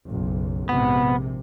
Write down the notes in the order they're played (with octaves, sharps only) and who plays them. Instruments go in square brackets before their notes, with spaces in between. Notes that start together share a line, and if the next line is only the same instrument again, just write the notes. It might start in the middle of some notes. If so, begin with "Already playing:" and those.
[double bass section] F#1 B1
[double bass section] A#1 G#2 C3 [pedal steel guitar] B3